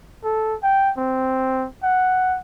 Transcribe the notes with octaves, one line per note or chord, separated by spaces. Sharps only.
A4
G5
C4
F#5